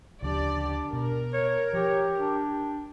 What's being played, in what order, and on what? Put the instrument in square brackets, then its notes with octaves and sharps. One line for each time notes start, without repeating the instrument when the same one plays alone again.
[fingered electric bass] D2 C#3 F3 [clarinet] D4 [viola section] G4 D5
[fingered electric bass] B2 [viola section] A#4
[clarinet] C#5
[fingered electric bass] F3 [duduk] G4 [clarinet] C#5
[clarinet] D4